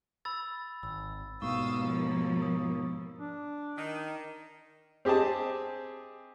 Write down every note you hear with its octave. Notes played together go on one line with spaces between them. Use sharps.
B5 E6 A6
G#1 E6
G#2 B2 F5 C#6 D#6 E6
D#2 F3 A#3
D#6
D4
D#3
C4 G4 G#4 D#5 A5